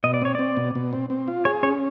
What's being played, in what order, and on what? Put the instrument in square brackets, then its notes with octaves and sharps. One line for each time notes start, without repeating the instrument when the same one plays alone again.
[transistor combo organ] B2 [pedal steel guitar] D#5
[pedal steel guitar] D5
[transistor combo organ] C4 [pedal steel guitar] C#5
[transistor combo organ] C4 [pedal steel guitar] D5
[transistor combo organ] B2
B2
C4
C4
F4
[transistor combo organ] G#4 [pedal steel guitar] C#5
[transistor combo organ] C#4 [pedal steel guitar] C#5